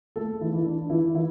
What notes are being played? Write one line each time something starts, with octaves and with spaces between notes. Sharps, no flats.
A3 A4
E3 E4
E3 E4
D4
E3 E4
E3 E4